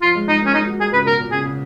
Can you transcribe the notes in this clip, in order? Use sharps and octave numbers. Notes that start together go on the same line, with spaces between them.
F3 F4
G#3
G#3 D#4
A#3 C#4
G#3 D#4
F#3
G#3 G#4
C#3 B4
B2 A#4
A#2
C#3 G#4
C#3